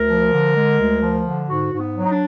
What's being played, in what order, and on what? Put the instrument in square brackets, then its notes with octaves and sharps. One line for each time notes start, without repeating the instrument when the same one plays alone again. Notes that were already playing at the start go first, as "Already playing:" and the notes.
Already playing: [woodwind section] D2 A#4
F3
D3
G#3
D2
F3
D3
G#2 F#4
G#2
B3
F#3
D#4
D4